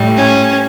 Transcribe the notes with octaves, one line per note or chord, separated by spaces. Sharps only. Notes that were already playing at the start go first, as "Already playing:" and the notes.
Already playing: A2 G3
C#4